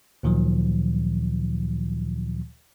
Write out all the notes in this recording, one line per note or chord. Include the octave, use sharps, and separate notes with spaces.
D2 A#2 D#3 F3 F#3